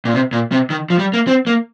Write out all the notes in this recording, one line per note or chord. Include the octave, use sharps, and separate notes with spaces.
A#2
C3
A#2
C3
D#3
F3
G3
A#3
C4
A#3